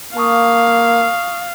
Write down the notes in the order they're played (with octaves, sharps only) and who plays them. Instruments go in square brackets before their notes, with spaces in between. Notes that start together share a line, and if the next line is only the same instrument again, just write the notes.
[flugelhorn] A#3 [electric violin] F5 [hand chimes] A5 C#6 D#6